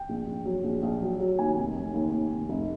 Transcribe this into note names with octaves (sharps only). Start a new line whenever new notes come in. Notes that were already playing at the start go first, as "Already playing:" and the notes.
Already playing: G5
A#1
A#1
F#3
A#1
A#1
F#3
F#3
D#2 G#5
F1
F1
D#2
D#2
F1
F1